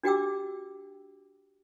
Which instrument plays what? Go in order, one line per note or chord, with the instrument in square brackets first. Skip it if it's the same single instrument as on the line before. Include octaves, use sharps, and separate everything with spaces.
[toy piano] D4 F#4 G4 G5 D6 E6